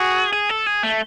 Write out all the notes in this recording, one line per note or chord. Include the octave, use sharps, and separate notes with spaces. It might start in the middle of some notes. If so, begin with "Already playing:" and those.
Already playing: F#4 G#4
G#4
A4
G#4
A3